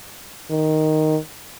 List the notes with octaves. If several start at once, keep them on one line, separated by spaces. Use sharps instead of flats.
D#3